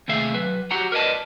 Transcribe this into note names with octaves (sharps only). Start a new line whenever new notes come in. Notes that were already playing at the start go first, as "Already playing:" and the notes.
D#2 C3 A3 G#4 E5 F5
F#3 B4
F#4 G4 F#5 A#5
A#4 B4 D5 D#5 A5